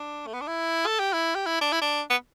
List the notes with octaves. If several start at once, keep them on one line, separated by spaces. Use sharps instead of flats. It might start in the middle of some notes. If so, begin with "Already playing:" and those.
Already playing: D4
A3
B3
D4
E4
A4
G4
E4
G4
E4
D4
E4
D4
B3